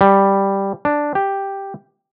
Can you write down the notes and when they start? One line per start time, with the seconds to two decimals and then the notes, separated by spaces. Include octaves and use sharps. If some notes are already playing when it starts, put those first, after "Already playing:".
0.01 G3
0.85 D4
1.15 G4